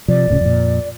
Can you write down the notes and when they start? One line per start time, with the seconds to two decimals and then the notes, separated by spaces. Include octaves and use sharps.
0.08 C3 F3 D5
0.28 D1 A2 C#3
0.41 F2 A#2